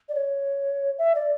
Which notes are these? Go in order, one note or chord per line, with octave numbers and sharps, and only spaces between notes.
D5
C#5
E5
D5